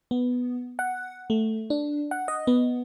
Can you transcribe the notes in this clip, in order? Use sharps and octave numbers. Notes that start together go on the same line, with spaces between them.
B3
F#5
A3
D4
F#5
D#5
B3